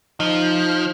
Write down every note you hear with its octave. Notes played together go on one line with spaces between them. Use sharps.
F3 D#4